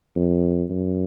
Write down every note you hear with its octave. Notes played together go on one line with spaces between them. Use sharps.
F2
F#2